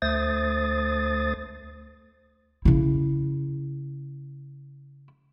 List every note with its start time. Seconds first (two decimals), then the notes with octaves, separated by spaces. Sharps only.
0.02 D2 A3 C5 D#6 A6
2.65 C#3 E4